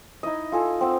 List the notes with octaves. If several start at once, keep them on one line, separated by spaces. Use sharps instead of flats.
D#4 E4 D#5
F4 A4 G#5
C4 F#5